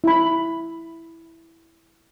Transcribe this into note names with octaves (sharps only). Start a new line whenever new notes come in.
E4 B5